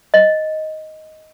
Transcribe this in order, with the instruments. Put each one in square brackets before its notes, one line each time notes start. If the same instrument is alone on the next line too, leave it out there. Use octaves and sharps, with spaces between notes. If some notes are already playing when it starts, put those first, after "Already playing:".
[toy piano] D#5